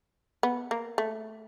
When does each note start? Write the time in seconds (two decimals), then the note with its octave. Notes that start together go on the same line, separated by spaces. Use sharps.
0.43 B3
0.71 A#3
0.98 A3